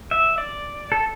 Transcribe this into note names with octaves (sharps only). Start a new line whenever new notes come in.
E5
D5
A4